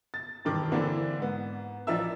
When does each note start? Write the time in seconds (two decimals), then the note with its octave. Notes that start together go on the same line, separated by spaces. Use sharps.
0.14 A6
0.45 E1 G2 D#3 D6
0.72 D3 E3 A#3 C4 D4 E4
1.18 G#2 B3
1.87 A1 F3 D4 A#4 E5 E6